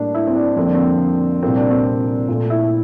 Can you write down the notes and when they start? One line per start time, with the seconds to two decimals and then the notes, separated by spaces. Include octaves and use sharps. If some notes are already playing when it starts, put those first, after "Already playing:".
Already playing: A2 G3 A#3 D4
0.15 E4
0.27 C4
0.35 D4
0.56 F2 D3 G3 A#3 C4
0.66 D4
0.75 C4
1.43 C2 A#2 G3 A#3 C4
1.57 D4
1.71 C4
2.28 A#2 A3
2.50 E4